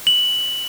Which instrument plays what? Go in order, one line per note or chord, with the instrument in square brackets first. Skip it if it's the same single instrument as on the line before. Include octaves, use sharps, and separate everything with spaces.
[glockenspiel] F#7